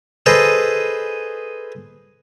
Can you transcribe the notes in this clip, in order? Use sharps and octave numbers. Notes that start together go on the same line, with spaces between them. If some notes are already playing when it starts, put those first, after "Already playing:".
G#4 A4 B4 C5 D#5